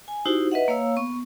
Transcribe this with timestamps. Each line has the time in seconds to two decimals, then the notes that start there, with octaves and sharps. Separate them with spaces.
0.08 G#5
0.26 D#4 E4 F#4 G4 C5
0.52 B4 D#5 E5 F#5
0.68 A#3 C#5 F5 E6
0.96 B3 C#6